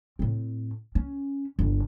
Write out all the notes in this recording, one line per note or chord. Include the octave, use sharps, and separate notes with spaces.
A2 C4
C#4
G1